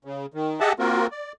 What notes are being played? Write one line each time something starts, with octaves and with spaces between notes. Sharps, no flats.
C#3
D#3
G4 G#4 D#5 E5 F#5 A5
A#3 C4 F4 F#4 A#4
D5